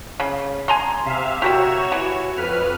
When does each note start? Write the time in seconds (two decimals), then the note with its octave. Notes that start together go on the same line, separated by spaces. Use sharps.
0.20 C#3
0.68 G#5 A#5 C6
1.05 C3 E5 F5
1.42 F#4 G4 A#4 C#5 E5 E7
1.92 E3
2.36 F2 B4 F6